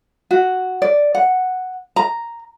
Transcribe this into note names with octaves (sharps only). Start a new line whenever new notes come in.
F#4
D5
F#5
A#5